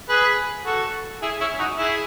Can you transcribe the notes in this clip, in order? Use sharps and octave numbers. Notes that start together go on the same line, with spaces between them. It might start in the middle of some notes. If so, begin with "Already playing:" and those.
G#4 B4
F#4 A4
E4 G#4
C#4 E4
D#4 F#4
E4 G#4